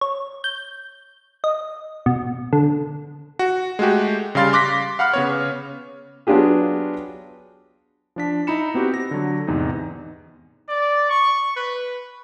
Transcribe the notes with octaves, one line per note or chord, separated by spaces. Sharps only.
C#5
G6
D#5
B2
D3
F#4
G#3 A3 F#4 G4
C#3 G3 F5 C6 A6
C6 D6 F#6 A#6 B6
F5 F#5 B5 F6
C#3 B3 C#5
F#3 B3 D4 F4 G4 G#4
F3 D4 B6
D#4 E4 A#5 B5 C#7 E7
B3 C4 F#4 G4
A#6
D3 F#3
E2 G#2 C3 D#4
D5
C#6
B4